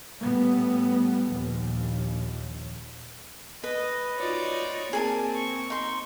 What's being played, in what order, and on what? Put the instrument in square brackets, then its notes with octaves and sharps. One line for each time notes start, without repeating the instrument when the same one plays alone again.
[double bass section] A2 G3 B3
A#1 D#2
[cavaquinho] B4 [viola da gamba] D#5
[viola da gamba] D#4 F4 F#4 [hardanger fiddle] C#5 D5
[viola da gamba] A#3 C4 [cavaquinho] G#4 G#5 A5 [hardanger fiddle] A#4
[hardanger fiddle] C#6
[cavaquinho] D#4 C6